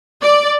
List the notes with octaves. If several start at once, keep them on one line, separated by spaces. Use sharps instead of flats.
D5